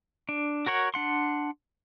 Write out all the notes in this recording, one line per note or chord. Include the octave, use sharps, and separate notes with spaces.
D4
F#4 A#4 C#5 F#5
D4 F#5 C6